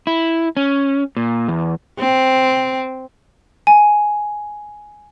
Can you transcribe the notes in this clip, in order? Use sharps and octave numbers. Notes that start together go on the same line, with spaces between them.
E4
C#4
A#2
E2
C4
G#5